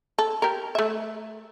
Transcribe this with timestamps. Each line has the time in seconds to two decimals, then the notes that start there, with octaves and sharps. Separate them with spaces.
0.18 A4
0.42 G4 A#4
0.75 A3 E5